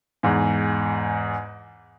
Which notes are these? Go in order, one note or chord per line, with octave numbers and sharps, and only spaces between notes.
E2 G#2